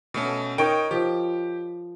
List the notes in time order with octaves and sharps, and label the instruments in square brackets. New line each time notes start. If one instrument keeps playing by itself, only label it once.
[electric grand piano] B2 A3 C#4
[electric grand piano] D#4 G5 D7 [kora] A#4 C#5 D#5
[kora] F3 [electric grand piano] G4